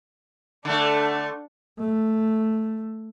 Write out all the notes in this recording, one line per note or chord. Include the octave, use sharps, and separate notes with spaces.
D3 A3 D4
A3